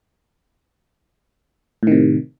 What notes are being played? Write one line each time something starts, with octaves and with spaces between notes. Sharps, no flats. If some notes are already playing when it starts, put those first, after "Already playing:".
A2 C3 D#3